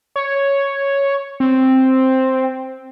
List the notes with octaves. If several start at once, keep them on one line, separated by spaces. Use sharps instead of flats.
C#5
C4